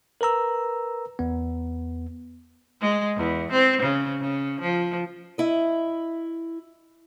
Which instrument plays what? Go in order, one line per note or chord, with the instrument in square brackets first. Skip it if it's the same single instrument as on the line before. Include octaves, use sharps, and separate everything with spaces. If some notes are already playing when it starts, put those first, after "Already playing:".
[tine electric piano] A#4 B4 A#5 E6
E2 B3
[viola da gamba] G#3
E2
C4
C#3
C#3
F3
[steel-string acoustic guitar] E4 D#5